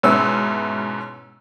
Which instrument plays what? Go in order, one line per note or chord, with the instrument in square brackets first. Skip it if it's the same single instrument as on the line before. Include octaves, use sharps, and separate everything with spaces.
[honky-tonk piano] G#2 B2 C#4 E4 B4 E6